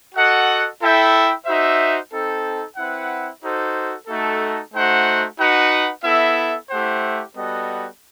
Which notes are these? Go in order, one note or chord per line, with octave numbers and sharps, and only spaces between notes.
F#4 A4 D#5 F#5
E4 A4 E5 G5
D#4 F#4 C5 E5
C4 D#4 A4
C4 E4 B4 F#5
D#4 F#4 A4 C5
A3 D#4 F#4 A4
A3 D#4 F#4 C5 F#5
D#4 F#4 B4 F#5
B3 E4 A4 E5
A3 E4 G4 C5 F#5
G3 B3 F#4 A4 D#5